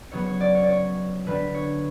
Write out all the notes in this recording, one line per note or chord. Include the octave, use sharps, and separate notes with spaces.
C#3 F#3 B3 C#5
C#5
D5
C#5
D5
C#5
D3 G3 D4 B4
C#5